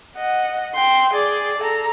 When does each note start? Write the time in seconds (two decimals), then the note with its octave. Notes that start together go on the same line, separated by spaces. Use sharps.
0.18 D#5 F#5
0.75 G5 C6
1.13 G#4 D5
1.59 A4 A#5